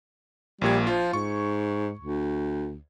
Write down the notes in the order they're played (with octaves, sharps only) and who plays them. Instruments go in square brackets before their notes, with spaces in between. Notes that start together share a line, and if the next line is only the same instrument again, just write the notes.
[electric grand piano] A#1 A#2 G#6 [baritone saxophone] G3
[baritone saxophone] F3 [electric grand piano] F4
[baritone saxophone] G#2 [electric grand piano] C#6
[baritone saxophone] D2